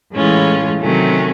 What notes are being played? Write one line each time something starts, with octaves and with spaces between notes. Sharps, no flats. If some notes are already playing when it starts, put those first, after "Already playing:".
A2 E3 G#3 C#4 F4
C3 D#3 F#3 A3 C#4